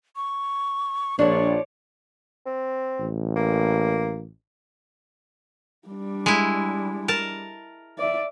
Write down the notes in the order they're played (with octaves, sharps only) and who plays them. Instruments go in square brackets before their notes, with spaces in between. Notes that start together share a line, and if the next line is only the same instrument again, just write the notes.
[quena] C#6
[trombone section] A#1 [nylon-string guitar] F3 D4 [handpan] C#5 D5 [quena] C#6
[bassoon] C4
[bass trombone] A1
[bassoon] A#3
[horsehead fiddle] G3 D4
[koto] G#3 E4
A#4 A5
[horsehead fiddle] D5 E5